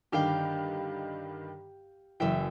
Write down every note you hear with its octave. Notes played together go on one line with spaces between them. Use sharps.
G2 D3 D#3 G4 F5 G5
F#1 E3 E5 G5